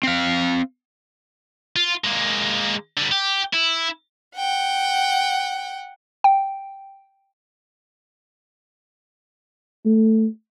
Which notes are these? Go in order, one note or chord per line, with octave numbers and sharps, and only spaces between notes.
C4 F5
F4
G#3 A#3
D3 G3
G4
E4
F#5 G5
G5
A3